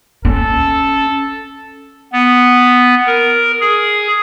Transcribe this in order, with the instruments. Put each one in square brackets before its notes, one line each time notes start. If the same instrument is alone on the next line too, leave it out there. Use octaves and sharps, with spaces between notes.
[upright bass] C#4 [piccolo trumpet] A4
[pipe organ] B3
A#4
G#4